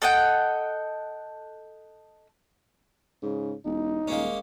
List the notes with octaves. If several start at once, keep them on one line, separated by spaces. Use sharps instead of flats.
A4 D#5 F#5 G5
G#2 C#3
E1 D#4
D#1 G#3 A#3 C#4